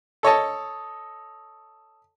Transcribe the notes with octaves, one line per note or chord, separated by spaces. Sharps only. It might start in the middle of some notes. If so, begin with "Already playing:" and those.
A4 C#5 D#5 A5